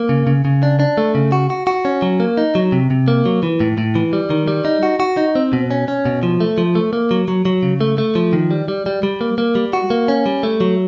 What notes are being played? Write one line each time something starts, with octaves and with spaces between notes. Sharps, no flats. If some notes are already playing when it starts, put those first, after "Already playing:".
Already playing: A#3
C#3
C#3
C#3
D4
D4
A3
C#3
F#4
F#4
F#4
C#4
F#3
A#3
D#4
F#3
C3
C3
A#3
F#3
E3
A2
A2
E3
G3
D#3
G3
D#4
F#4
F#4
D#4
C4
B2
C#4
C#4
B2
F3
A3
F3
A3
A#3
F#3
F#3
F#3
C#3
A3
A3
F3
D#3
G3
G3
G3
G3
A#3
A#3
G3
F#4
A#3
C#4
G3
A3
F#3